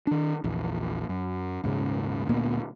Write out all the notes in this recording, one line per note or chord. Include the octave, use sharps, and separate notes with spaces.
D#3 D4
A#1 E2
F#2
D#1 G#2 C#3
D2 A#2 A#3 B3